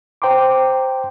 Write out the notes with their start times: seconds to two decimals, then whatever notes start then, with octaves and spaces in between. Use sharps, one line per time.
0.22 C5 G5 A#5 C6 D6